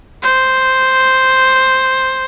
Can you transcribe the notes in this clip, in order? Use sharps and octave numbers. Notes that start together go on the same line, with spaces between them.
C5